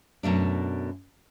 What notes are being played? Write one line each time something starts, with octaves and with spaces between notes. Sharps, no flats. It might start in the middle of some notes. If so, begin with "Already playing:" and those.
F#2 B2 A3 D4